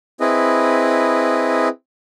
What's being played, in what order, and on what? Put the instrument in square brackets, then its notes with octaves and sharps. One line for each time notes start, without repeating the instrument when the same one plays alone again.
[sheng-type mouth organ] C4 E4 G#4 B4 D#5